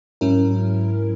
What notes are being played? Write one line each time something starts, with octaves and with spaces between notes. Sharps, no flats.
G#2 F#3 C#4 E4 A#4